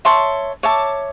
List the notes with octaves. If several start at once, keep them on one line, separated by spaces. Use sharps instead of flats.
C#5 E5 A5 C6
C#5 E5 A5 D6